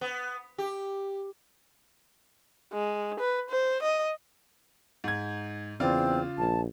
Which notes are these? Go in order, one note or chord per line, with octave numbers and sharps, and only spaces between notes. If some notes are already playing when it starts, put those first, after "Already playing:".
B3
G4
G#3
B4
C5
D#5
G#2 G#6
E2 C#3 C4 F4 D5
A#1 A5